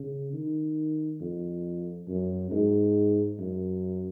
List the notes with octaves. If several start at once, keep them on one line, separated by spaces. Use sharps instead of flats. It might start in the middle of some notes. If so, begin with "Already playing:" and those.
Already playing: C#3
D#3
F2
F#2
G#2
F#2